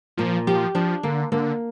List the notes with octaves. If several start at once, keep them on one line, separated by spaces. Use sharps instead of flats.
A#2 F3
F3 G4
F3 D4
D3 A#3
D3 A#3